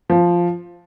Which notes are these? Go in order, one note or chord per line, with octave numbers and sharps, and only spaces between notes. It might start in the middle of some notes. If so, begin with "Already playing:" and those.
F3